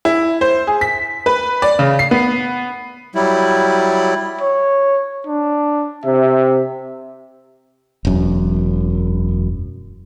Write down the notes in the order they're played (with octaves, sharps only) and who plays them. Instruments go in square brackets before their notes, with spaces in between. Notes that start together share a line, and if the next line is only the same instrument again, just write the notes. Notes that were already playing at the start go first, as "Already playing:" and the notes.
[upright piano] E4
C5
G#4
B6
B4
D5
C#3
C7
B3
[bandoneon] F#3 G3 E4
[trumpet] C#5
D4
[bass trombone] C3 [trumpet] E5
[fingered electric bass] E1 F#2